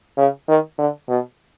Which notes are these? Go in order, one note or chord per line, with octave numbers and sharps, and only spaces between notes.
C#3
D#3
D3
B2